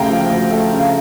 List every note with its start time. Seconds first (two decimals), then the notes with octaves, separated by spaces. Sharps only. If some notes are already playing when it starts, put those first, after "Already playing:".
Already playing: D2 C#3 A3 F5 G5 A#5
0.08 F3
0.29 D2
0.51 A3
0.73 C#3